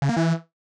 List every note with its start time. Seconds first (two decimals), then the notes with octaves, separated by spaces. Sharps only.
0.02 C#3
0.09 A#3
0.17 E3